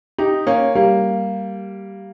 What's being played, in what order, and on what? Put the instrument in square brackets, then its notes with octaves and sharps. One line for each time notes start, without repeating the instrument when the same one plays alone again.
[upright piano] D#4 G4
A#3 C#4
G3 A#3